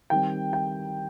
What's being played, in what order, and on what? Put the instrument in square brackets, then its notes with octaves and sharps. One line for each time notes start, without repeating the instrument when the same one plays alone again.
[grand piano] D#3 G3 C4 G5
G5